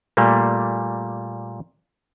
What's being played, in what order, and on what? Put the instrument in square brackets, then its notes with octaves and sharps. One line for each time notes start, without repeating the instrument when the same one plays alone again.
[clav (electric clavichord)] A#2 G3 A3 A#3